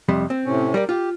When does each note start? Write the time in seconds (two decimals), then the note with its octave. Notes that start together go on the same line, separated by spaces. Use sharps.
0.09 F2 C3 G3
0.30 C4
0.45 A2 C3 C#4
0.74 G3 A#4 D5
0.89 F4 G4